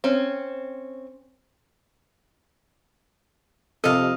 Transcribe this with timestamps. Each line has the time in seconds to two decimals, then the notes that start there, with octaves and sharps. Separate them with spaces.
0.04 C4 C#4
3.84 F2 C3 A4 D#5 F5